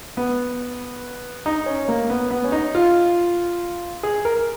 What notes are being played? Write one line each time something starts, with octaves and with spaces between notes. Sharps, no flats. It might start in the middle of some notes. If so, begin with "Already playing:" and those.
B3
D#4
C#4
A#3
B3
B3
C#4
D#4
F4
G#4
A#4